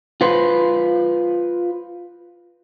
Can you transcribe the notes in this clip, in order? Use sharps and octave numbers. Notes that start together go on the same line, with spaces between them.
F4 B4 C5